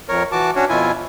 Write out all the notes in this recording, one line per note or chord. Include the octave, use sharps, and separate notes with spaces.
F2 A#4 C#5
E3 F#4 A5 D6
C#4 D4 F#4 C#5
F2 B2 E4 F4 G#5